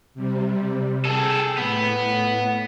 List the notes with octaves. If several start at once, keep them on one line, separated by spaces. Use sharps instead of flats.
C3 G3
G#4 A4 G5
A2 B3